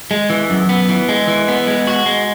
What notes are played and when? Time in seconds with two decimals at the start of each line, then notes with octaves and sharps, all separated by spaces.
0.11 G#3
0.30 E3
0.50 F#2
0.69 B3
0.89 E3
1.09 G#3
1.27 E3
1.48 B3
1.67 G#3
1.87 F#4
2.06 G#3